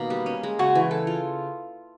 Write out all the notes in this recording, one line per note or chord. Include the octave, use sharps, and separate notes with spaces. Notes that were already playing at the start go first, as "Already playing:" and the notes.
Already playing: B2 D#3 A#3
G3
C#4
G#3
C#3 F#4
E3
A4
F4